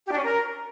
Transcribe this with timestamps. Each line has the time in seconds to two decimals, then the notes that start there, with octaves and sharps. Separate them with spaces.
0.06 G4
0.12 D4
0.18 C#4
0.23 A#4